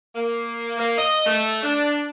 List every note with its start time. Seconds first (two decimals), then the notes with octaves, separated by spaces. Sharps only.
0.16 A#3
0.78 A#3
0.97 D#5
1.25 A3
1.63 D4